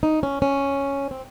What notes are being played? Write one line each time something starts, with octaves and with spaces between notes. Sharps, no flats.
D#4
C#4
C#4
C4